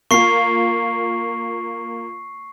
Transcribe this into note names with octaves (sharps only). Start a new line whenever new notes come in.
A#3 F4 C#6 C7